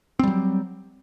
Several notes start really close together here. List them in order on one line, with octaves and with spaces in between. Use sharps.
C4 G3 F#3